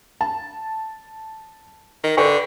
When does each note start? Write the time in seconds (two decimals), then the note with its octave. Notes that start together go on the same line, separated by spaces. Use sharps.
0.21 A5
2.04 D#3
2.17 D3 B4 G5 C#6